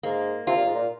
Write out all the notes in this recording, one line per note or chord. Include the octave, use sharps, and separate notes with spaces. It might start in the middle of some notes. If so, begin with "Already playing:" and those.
G#2 A#3
C3 F4
A#2
G#2
A#2